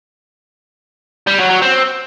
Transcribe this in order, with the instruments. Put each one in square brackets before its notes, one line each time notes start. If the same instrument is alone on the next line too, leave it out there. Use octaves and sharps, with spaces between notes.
[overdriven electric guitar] G3
F#3
F#3
C4